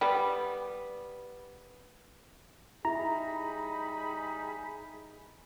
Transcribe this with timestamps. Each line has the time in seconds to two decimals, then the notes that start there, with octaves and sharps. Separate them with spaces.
0.01 G3 B3
2.85 G3 D#4 E4 G#4 A#5 B5